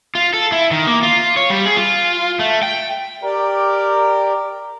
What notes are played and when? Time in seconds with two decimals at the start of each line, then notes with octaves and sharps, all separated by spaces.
0.15 F4
0.34 A4
0.52 E4
0.71 D#3
0.87 A#3
1.03 F4
1.37 C#5
1.50 G3
1.65 G#4
1.77 F4
2.39 A3
2.63 G5
3.23 G4 A#4 D5 G5